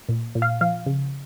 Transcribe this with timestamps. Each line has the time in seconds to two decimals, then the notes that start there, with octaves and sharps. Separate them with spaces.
0.09 A#2
0.35 A#2
0.42 F5
0.61 F3 F5
0.86 C#3